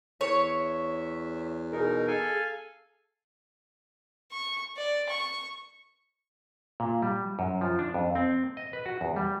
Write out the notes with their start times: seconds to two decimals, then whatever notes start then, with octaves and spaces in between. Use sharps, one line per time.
0.21 E2 C#5 E5
1.72 B2 D#4 G#4 A#4
2.08 A4 F5 G#5
4.32 C#6
4.77 D5
5.09 C#6
6.80 A#2
7.02 G3
7.39 F#2
7.61 F3
7.79 D4
7.94 F2
8.15 C4
8.57 D#5
8.73 B4
8.86 F#4
9.01 E2
9.16 G3